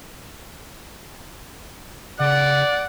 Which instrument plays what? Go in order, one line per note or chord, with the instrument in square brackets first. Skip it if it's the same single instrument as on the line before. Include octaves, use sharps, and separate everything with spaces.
[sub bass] C#3 [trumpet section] D5 [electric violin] F#5